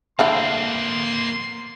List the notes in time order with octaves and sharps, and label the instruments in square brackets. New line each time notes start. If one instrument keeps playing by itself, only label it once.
[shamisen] A3 D4 E4 [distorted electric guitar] A#3 C4 [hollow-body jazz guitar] F5 F#5 [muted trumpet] C6